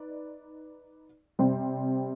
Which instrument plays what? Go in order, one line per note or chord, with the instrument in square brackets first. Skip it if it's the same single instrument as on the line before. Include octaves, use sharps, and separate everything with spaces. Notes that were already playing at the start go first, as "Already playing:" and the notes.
Already playing: [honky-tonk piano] D#4 B4 D5
C3 G3 C4